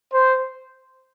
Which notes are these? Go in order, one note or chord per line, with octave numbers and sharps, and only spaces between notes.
C5